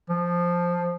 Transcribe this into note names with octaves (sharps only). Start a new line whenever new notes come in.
F3